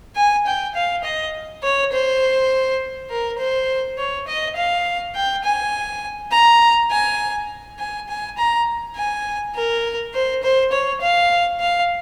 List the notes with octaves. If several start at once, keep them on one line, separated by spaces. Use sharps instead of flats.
G#5
G5
F5
D#5
C#5
C5
A#4
C5
C#5
D#5
F5
G5
G#5
A#5
G#5
G#5
G#5
A#5
G#5
A#4
C5
C5
C#5
F5
F5